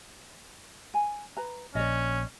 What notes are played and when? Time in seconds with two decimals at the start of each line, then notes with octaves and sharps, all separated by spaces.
0.94 G#5
1.37 B4 A#5
1.75 A#1 C#4 D5 D#5